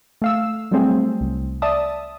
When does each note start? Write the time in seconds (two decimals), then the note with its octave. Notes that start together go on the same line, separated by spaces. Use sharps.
0.22 A3 F5 E6
0.71 F#3 G3 A3 C4 G#4
1.21 C2
1.62 D5 E5 A5 D#6